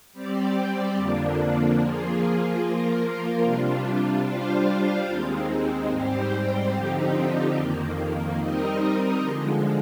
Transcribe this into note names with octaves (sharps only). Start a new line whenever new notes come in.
G3 C4 G4 D5
F2 D3 F3 A#3 D4
F3 A#3 F4 G#4
F3 A#3 F4 A#4
C3 G3 D4 F4
G3 D4 F4 C5 F5
D#2 D#3 G#3 C4
G#2 G3 C4 G4 C5
D3 F3 C4 D#4 G4
F2 D#3 A#3
G3 C4 D#4 A#4 D#5
D3 F3 G#3